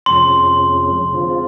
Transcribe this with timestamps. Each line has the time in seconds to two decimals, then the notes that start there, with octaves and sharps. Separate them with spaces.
0.06 F2 C3 F3 G#3 C#4 C6
1.13 D3 F3 G#3 C4 F4